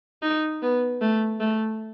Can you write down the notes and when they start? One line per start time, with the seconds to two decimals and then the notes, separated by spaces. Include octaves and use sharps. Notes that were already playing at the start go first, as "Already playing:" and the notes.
0.23 D#4
0.62 B3
1.01 A3
1.40 A3